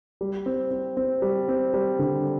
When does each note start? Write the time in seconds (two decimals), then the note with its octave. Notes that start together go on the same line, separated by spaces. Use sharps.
0.21 G3
0.46 C4
0.71 C4
0.97 C4
1.22 G3
1.49 C4
1.74 G3
1.99 D3